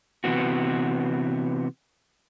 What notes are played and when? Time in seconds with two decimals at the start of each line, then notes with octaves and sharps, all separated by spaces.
0.24 C3 E3 B3 F#4